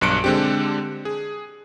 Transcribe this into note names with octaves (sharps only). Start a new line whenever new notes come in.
B1 G2 F#6 C#7 D7
D3 G#3 C4 D4 G4
G#4